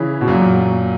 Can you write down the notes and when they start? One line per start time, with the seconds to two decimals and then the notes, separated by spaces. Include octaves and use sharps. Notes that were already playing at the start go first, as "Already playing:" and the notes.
Already playing: C#3 E3
0.21 B2
0.28 F#2 A#2